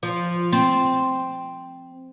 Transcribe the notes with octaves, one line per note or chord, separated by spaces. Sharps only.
F3
C4